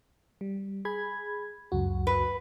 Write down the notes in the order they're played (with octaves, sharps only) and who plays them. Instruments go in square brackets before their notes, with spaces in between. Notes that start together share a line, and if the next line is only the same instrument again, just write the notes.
[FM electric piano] G3
G#4 B5 G#6
C#2 F#2 F#4
[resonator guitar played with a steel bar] B4